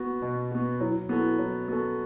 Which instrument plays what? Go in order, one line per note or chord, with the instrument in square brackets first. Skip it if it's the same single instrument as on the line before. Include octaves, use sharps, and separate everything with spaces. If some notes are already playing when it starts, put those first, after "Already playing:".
Already playing: [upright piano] B3 F#4
B2
B3 F#4
[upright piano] F#3 [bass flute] E4
[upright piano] B3 F#4 A4 [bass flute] E4
[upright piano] F#3
B3 F#4 A4